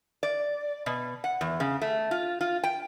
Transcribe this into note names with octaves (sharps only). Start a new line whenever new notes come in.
D5
B2
F#5
E2
C#3
A3
F4
F4
G5